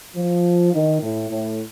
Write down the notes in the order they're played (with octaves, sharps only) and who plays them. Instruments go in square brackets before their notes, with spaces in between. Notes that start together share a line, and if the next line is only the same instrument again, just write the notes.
[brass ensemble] F3
D#3
A2
A2